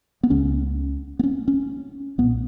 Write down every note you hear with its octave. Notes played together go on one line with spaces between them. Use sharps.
B3
C#2 C#3 C#4
B3
C#4
C#4
B1 A#2 B3